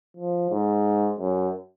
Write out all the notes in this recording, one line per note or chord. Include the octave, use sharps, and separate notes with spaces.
F3
G#2
F#2